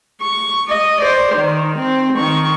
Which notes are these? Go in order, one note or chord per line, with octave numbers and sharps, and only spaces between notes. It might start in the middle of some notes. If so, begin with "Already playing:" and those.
C#6
D#5
C5 D5
D#3
C4
D#3 C#6